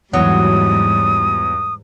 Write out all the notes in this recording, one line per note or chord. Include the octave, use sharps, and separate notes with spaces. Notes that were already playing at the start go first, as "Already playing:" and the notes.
E2 G#2 F#3 G3 D#6